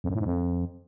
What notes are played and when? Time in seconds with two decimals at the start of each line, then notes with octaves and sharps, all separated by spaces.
0.04 F2
0.09 F#2
0.15 A2
0.20 G#2
0.26 F2